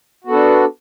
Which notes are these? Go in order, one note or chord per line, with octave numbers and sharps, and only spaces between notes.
B3 D4 F#4 A4